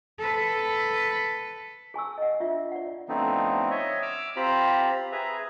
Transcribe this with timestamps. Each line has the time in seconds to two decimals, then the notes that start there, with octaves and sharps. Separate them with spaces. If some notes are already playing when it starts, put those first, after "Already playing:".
0.19 A4 B4
1.94 G#4 G#5 C#6 E6
2.18 D#5 F#5
2.40 D4 F4 E5
2.72 D5 F#5
3.09 D3 F3 A3 B3 C4 D#4
3.71 C#5 D#5 E5
4.02 D6 E6 F6
4.36 C4 F4 G4 C5 A#5 B5
5.12 G#4 B4 E5 A#5